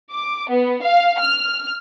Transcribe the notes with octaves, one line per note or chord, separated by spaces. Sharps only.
D6
B3
F5
F6